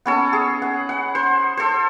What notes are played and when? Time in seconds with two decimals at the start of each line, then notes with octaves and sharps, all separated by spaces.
0.06 B3 C#4 A4
0.33 G#4
0.62 F#5
0.89 F#5
1.15 C5
1.57 A4 C5